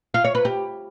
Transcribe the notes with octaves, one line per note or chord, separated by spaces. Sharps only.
F4
C#5
B4
G4